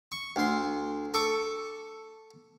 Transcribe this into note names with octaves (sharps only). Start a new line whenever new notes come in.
C#6
D2 C6
A4 C#6 D6